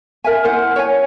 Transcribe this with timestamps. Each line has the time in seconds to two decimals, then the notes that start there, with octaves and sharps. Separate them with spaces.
0.24 A#4 E5 G#5
0.45 E4 A#4 C5 F#5
0.76 C#5 G#5